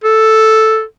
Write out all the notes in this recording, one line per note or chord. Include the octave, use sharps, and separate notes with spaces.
A4